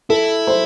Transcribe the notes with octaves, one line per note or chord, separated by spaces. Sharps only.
E4 A4
C5